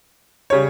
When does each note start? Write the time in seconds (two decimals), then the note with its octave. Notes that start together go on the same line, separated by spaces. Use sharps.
0.50 C#3 G3 C#5